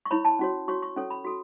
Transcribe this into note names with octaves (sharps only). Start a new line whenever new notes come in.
C#6
E4 C#5 B5
A5
C#4 F#4 C#5
F#4 C#5 C#6
C#6
C#4 A4 C#5
B5
F#4 A4